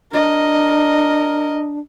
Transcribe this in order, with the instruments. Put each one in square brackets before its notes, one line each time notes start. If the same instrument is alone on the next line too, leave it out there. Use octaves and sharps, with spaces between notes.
[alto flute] D4 [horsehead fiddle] A#4 D#5